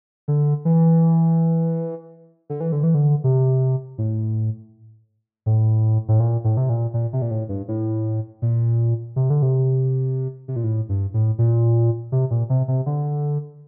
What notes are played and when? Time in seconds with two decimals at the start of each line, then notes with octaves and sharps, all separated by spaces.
0.28 D3
0.65 E3
2.50 D3
2.61 E3
2.72 D3
2.84 E3
2.94 D3
3.24 C3
3.98 A2
5.46 A2
6.08 A2
6.20 A#2
6.44 A2
6.57 C3
6.69 A#2
6.94 A#2
7.13 C3
7.22 A#2
7.31 A2
7.49 G2
7.68 A2
8.42 A#2
9.16 C3
9.30 D3
9.42 C3
10.48 C3
10.56 A#2
10.64 A2
10.89 G2
11.14 A2
11.38 A#2
12.12 C3
12.31 A#2
12.50 C3
12.68 C3
12.86 D3